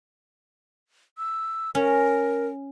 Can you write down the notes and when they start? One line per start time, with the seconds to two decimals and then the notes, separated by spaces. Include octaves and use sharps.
1.18 E6
1.75 C#4 A#4